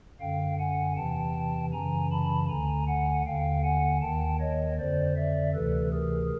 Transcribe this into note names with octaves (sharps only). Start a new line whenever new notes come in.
F#2 D3 F5 G5
F#5 G#5
E2 C3 E3 G5 A5
F#2 C#3 E3 G#5 A#5
A5 B5
D2 D3 G#5 A#5
F#5 G#5
D#2 D3 F5 G5
F#5 G#5
D#2 D#3 G5 A5
C#5 D#5
F2 D3 C5 D5
D5 E5
D2 C3 E3 A4 B4
G#4 A#4